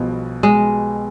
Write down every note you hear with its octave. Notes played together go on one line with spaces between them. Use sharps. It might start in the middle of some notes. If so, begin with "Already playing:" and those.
Already playing: B1 B2 F3 G3
G#3